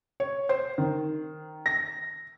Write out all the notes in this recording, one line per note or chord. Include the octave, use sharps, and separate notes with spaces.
C#5
C5
D#3
A#6